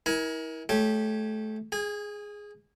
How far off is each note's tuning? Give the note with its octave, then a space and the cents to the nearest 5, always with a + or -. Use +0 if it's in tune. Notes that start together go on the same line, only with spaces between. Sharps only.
E4 -35 A#4 +25 G#5 +0
A3 -25 G4 +0 C#5 +0
G#4 +0 G#5 -30